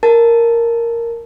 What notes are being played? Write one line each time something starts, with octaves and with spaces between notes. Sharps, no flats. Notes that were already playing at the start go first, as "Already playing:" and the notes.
A#4 A5 A6